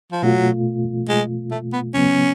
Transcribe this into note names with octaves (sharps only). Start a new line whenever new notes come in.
F3
B2 F#3 A3 F4
G#3
A3
B3
C#3 F#3 B3 C#4